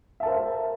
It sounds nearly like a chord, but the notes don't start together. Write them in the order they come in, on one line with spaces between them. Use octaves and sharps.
E5 A5 A#4 C5